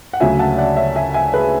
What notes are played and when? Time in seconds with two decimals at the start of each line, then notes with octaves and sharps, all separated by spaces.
0.13 F#5
0.20 D2 C#3 F#3 E5 G#5
0.39 F#5 A5
0.58 D5 F#5
0.76 C#5 E5
0.96 E5 G#5
1.14 E5 G#5
1.34 G#4 B4